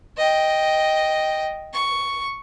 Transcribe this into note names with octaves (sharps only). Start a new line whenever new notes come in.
D#5 G5
C#6